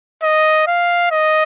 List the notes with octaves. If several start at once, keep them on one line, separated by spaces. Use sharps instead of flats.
D#5
F5
D#5